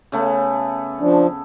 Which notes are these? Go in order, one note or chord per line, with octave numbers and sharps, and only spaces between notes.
C#3 A3 B3
F3 D4